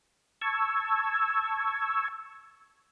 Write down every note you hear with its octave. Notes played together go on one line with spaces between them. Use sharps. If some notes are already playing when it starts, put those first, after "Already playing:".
A5 C#6 E6 G#6